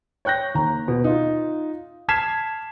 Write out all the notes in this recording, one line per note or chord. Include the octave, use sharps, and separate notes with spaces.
C#5 G5 F#6 G6 A#6
D#2 A#5
B2
D#4 F4
A5 F6 G#6 B6 C7 E7